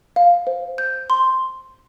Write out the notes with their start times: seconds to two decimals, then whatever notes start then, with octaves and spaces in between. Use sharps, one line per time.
0.16 F5
0.47 C5
0.78 G6
1.10 C6